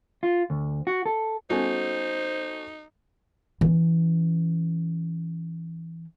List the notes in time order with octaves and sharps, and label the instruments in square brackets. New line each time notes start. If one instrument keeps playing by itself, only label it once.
[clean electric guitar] F4
D2
F#4
A4
[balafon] G3 B3 C#4 [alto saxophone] D#4 [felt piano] F#4 A4 G#5 [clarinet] C5
[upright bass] E3 C#4